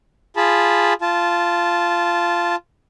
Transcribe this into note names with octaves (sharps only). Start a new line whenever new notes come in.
F4 G#4 A5 B5
F4 A5